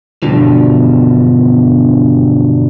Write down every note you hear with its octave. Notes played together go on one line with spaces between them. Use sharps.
E2 G2 B2 D3 F3